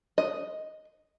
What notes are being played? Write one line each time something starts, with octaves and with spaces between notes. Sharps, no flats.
D#5